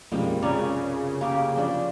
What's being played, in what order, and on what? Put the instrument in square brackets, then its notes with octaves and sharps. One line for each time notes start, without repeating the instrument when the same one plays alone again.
[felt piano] B1 F#2 C3 [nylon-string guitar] F3 G#3 A#3 [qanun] G3
[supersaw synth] C#3 [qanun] C#4 [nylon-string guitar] F4 A#4 D5
[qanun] A#3 G4
[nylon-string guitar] F3 D4 D5